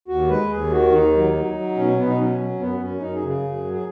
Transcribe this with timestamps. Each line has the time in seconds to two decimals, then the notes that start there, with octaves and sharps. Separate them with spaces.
0.08 D#2 F#4
0.29 G#3 B4
0.50 D#2 G#4
0.71 D#3 F#4
0.92 D#2 D#4
1.13 F#3
1.34 F#3
1.54 F#3
1.75 B2 C#4
1.97 B2 B3
2.08 D#4
2.17 F#3 C#4
2.38 F#3
2.59 F#2 B3
2.80 F#2 C#4
3.01 F#2 D#4
3.15 G#4
3.22 C#3
3.28 G#4
3.44 F#2
3.64 F#3
3.73 G#4